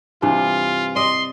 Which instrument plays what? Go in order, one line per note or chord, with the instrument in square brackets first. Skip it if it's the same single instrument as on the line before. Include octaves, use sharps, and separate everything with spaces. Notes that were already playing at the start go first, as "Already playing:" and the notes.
[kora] G2 C3 E3 [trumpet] F4
[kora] D5 D#5 [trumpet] C6